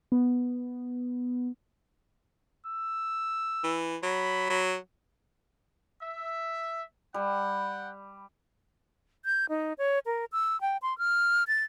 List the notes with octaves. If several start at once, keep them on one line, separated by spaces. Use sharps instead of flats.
B3
E6
E3
F#3 B5
F#3
E5
G3 F#5 G5
G6
D#4
C#5
A#4
E6
G5
C6
F6
A6